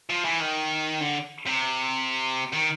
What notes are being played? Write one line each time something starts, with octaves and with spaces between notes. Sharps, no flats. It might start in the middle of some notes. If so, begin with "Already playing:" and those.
F3
E3
D#3
D3
C3
D#3